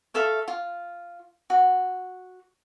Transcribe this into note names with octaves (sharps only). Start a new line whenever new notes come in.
A4 E5 F5 C#6
F4
F#4